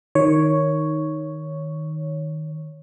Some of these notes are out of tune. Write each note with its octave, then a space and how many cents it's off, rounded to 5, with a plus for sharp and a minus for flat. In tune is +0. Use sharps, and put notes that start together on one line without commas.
D#3 +0 C#5 +0